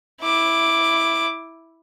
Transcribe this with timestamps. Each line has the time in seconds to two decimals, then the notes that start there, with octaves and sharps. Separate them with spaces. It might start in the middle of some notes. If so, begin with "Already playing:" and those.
0.21 E4 D6